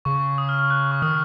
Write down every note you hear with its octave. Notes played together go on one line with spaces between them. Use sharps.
C#3 C#6
D#6
F6
F6
F#6
C#6
D#3 D#6